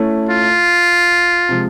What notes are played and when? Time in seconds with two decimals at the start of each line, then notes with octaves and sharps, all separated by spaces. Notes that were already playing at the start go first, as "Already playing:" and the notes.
Already playing: A3 C#4 E4
0.29 F4
1.49 C3 F3 G#3